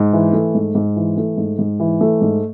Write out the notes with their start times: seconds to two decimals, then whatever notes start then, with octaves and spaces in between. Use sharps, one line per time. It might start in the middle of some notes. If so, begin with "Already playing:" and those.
Already playing: G#2
0.13 E3
0.33 A3
0.55 G#2
0.75 G#2
0.96 E3
1.17 A3
1.37 G#2
1.59 G#2
1.80 E3
2.01 A3
2.21 G#2